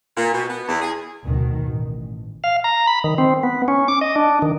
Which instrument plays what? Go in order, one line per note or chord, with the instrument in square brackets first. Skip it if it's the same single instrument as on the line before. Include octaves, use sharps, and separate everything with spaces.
[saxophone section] A#2
B2
B3
E2
G#4
[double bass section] D2 B2 D#3
A1
[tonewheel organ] F5
A#5
B5
D#3
C4
B3
C#4
D6
D#5
D4
D#3